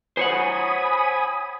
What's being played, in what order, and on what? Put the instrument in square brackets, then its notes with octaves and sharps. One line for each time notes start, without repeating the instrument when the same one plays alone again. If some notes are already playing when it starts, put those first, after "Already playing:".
[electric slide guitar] C5 C#5 F#5 [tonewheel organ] G#5 B5 D#6